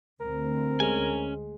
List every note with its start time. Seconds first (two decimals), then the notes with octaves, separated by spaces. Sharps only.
0.21 D2 C4 A#4
0.80 G#3 C#4 G#5